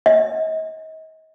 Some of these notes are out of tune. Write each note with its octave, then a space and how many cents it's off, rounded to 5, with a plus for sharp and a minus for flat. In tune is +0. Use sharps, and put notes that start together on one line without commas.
D#5 +35